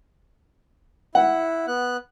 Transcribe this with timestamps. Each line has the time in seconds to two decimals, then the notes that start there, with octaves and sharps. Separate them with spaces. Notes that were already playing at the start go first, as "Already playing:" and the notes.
1.15 E4 F#5
1.68 B3 F#6